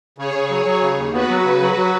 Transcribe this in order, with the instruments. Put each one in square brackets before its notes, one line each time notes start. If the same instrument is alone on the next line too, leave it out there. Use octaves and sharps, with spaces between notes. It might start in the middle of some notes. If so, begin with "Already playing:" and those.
[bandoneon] C#3 [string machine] G#4 C#5
[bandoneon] C#3
F#3
F#3
C#3
D#2
[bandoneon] B3 [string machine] F#4 B4
[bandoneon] F#3
C#3
F#3
F#3